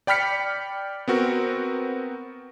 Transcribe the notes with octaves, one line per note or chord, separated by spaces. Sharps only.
D5 G5 B5 F6 B6 C#7
B3 C4 F#4 A#4